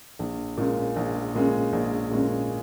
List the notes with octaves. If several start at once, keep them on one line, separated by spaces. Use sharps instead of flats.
A#1
A#2 G#3 C#4
A#1
A#2 G#3 C#4
A#1
A#2 G#3 C#4